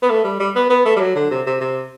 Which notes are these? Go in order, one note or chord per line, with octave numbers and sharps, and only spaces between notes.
B3
A3
G3
G3
B3
B3
A3
G3
F#3
D3
C3
C3
C3